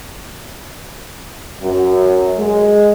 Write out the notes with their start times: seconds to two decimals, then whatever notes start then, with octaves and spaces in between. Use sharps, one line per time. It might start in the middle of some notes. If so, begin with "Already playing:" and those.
1.63 F#2
2.39 G#3